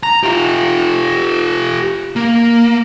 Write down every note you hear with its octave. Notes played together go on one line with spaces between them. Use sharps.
A#5
F4 G4
A#3